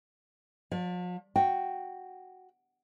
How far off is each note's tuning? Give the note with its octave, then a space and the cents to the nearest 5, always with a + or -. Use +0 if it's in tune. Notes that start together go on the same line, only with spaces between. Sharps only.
F3 +45 D5 +0
F#4 +0 G5 +0